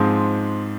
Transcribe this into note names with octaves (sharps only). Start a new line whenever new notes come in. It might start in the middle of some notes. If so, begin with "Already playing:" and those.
Already playing: G#2 F3 G#3 C4